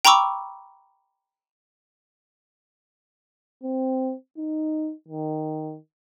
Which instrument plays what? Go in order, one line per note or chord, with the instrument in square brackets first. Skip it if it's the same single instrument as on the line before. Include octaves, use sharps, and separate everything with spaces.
[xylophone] G5 A#5 B5 C#6 D6 E6
[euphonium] C4
D#4
D#3